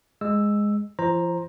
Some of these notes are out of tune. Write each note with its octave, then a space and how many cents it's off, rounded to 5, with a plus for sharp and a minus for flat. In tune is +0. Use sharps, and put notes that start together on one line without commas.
G#3 -5 E6 +5
F3 -40 C5 +15 A#5 +0